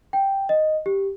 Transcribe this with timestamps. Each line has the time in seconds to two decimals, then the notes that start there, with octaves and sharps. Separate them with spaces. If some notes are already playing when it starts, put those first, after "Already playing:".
0.13 G5
0.49 D#5
0.86 G4